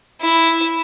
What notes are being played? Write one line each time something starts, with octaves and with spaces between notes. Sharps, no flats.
E4